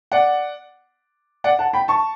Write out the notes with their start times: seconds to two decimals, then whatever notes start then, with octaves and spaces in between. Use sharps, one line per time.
0.12 D5 F#5
1.44 D5 F#5
1.59 F#5 A5
1.73 G5 B5
1.88 A5 C#6